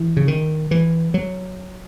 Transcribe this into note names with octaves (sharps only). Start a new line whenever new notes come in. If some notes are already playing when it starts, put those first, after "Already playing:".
Already playing: E3
C#3
D#3
E3
F#3